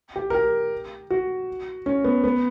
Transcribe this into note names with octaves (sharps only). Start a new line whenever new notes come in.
G4
A#4
G4
F#4
C#4
B3
B3